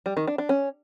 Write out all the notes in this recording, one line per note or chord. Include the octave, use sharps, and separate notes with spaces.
G3
D#3
D4
D4
C#4